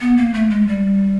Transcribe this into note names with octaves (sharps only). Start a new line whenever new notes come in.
B3
A#3
A3
G#3
G3